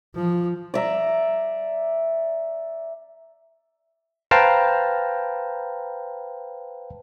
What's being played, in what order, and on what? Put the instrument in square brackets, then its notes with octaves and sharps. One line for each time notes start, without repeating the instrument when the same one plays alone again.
[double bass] F3
[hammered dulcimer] D5 E5 A#5
[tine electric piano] B4 C5 F5 G5 A5 A#5